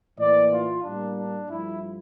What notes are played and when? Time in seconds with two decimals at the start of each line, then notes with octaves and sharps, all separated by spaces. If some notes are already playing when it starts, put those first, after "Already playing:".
0.18 A2 E3 A#3 D5
0.52 F4
0.84 A2 G3 A#3 D4
1.18 D4
1.50 G2 F3 A3 E4